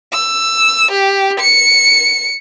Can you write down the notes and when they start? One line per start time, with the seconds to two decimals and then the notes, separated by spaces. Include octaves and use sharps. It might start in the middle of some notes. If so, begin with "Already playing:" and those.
0.13 E6
0.91 G4
1.40 C#7